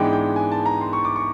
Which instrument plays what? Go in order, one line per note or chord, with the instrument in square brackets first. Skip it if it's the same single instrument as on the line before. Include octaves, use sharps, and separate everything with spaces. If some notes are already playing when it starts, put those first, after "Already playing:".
Already playing: [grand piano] G#2 E3 G#3 B3 D4 G5
G5
G#5
A5
A#5
C6
C#6
D6
C#6